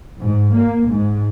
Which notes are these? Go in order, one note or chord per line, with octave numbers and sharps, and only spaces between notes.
G#2
A#3
G#2